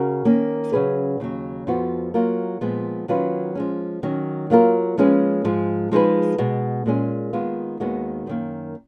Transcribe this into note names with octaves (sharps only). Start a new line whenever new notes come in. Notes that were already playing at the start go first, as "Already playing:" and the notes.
Already playing: C#3 F#4 A#4
D#3 A#3 C#4
C#3 F#3 C#4 G#4 B4
D#2 C#3 F#3
F2 F3 B3 F#4
F#3 A#3 F4 A#4
A#2 F3 G#3 B3
D#3 F#3 C#4 F4 B4
F3 G#3 C#4
D#3 F#3 C#4
F#3 A#3 F4 A#4
F3 G#3 C#4 G#4 B4
G#2 F3 G#3
F3 G#3 D#4 G#4 B4
B2 G#3 B3
A#2 G#3 C#4 G#4
D#3 G#3 B3 F4
D#2 D#3 G#3 B3 F#4
F#2 D#3 A#3